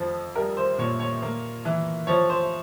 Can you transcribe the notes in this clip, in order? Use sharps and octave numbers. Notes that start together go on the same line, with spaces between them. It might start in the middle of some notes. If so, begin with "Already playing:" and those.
Already playing: F2 F3
G3 A#4
C5
A#2 C#5
C#5
A#3
E3
F3 C#5
C5